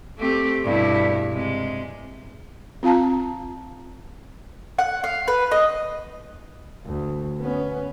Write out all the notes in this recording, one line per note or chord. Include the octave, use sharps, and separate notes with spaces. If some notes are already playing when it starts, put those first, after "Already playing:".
A3 C4 G4
G2 B2 E4
C3 G#3
C4 F4 F5 A5 A#5
F#5
F5
B4
D#5
D2
B3 C#4